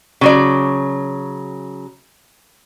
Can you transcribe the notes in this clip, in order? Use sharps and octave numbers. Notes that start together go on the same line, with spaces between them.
C#3 F#3 D5